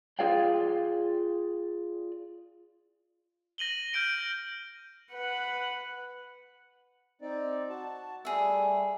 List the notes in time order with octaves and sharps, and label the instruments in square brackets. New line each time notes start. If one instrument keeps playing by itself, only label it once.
[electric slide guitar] F4 G#4 D5 F5 G5
[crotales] A#6 D#7 F#7 G7
F6 G6 A#6 D7 D#7 F#7
[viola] B4 F#5
[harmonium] C4 D#4 D5
F#4 A5
[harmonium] G3 A3 [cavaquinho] G#4 E5